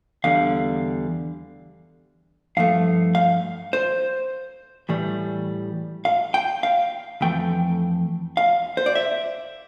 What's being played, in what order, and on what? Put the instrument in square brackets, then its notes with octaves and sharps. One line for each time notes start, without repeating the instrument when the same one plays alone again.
[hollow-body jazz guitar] E2 D3 G3 F5
G2 F3 A3 F5
F5
C5
A2 E3 G3
F5
G5
F5
F2 E3 A3 G5
F5
C5
D5
E5